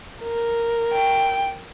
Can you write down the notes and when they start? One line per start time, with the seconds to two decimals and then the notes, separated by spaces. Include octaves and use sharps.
0.23 A#4
0.93 G5